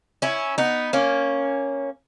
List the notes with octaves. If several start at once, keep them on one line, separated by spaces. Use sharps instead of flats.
C#4 E4
B3 D#4
A#3 C#4